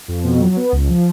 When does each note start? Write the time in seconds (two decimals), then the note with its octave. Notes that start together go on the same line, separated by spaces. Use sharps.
0.08 F2
0.24 B2
0.41 F#3
0.57 B3
0.73 C#2
0.89 F3